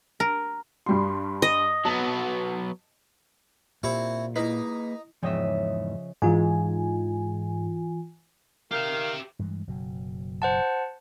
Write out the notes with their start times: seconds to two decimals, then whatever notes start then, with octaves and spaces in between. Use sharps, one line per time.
0.20 A#4
0.86 G2 G3 C6
1.42 D#5
1.85 F#3 B3 A5
3.83 A#2 C4 E4 G4 C#6
4.36 A#3 D#4 E4 G#4 B4
5.23 E2 G#2 C#3 F3 D#5 E5 G5
6.22 G#2 E3 F4 G#5
8.72 D#3 G4 E5 F5
9.39 G2 E3 G#3
9.67 F#1 B2 F#3
10.42 C5 F#5 A5